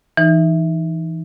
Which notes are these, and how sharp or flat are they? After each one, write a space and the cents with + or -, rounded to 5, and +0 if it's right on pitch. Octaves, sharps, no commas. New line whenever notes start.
E3 +0 D#4 +0